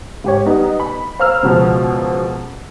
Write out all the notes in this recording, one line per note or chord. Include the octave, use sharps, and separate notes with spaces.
G#2 G4 C#5
G3 B3 D#4
B5
C5 F5 A#5 E6 F6
C#2 B2 F3